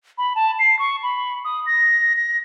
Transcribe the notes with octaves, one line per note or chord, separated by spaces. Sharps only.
B5
A5
C7
C#6
B5
D#6
A#6
A#6